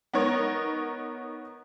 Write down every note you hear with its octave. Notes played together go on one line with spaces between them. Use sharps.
B3 D#4 A#4 C#5